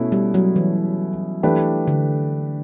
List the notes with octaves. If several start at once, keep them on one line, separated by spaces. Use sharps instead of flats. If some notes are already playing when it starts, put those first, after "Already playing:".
Already playing: B2 A3 C#4 E4
G3
F#3
E3
E3 A3 D4 G4 B4
D3